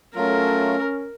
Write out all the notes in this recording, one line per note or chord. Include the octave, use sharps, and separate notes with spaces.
F#3 A3 C#4 F4 A4 A#4